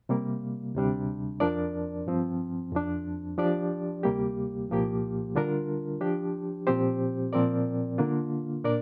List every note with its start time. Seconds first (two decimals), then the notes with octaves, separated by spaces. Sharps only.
0.09 C3 G3 A#3
0.75 D2 C3 G3 D4
1.40 F2 F3 D4 A#4 D5
2.07 G2 F3 C4
2.72 F2 F3 D4
3.38 F3 D4 G4 D5
4.03 D2 C3 G3 A#3 G4
4.69 C2 A#2 F3 A#3 G4
5.35 D3 G3 D4 F4 A#4
6.01 F3 D4 G4
6.67 A#2 F3 C4 G4 C5
7.33 A#2 F3 C4 A#4 D5
7.98 D3 A#3 D4 F4
8.64 A#2 A#3 D4 A#4 D5